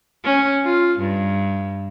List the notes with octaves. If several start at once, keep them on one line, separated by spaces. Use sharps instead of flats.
C#4
F4
G2